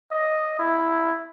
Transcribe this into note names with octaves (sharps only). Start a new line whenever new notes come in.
D#5
E4